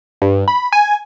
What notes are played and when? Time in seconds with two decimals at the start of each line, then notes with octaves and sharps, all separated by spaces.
0.22 G2
0.48 B5
0.72 G#5